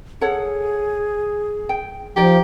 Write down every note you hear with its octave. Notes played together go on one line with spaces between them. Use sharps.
G#4 A4 C#5 F#5
G5
F3 D#4 G4 D5 G5